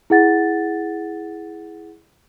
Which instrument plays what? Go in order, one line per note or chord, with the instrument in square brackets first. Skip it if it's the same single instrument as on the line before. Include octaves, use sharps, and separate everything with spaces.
[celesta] E4 G#4 F#5 A6